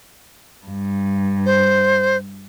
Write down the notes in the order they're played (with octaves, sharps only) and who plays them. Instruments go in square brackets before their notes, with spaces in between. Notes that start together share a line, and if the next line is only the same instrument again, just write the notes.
[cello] G2
[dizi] C5